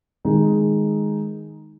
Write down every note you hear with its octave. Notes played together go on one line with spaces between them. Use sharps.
D#3 G#3 D#4